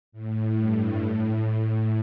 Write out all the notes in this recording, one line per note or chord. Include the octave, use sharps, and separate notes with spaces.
A2
G2
A2
A2